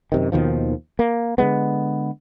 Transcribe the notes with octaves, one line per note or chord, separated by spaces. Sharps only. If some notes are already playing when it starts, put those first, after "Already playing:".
F#2 C3 D#3
D#2 B2 D#3 F3
A#3
D3 F#3 G#3 B3